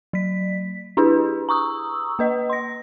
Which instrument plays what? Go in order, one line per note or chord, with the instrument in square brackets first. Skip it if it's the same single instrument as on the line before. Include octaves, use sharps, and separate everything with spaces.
[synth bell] F#3 B6
D4 E4 G4 G#4 B4
A#5 C#6 D#6 E6
A#3 B4 D#5
C6 A#6